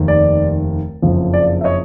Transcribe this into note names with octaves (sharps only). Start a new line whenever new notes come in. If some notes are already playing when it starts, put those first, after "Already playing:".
Already playing: F1 D#2 D#3
D5
F#1 F2 C#3 F3
D5
E5
C#5 D#5